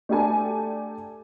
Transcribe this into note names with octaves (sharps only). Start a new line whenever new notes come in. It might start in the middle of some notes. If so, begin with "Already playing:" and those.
A3 D4 G4 A4 G#5 A5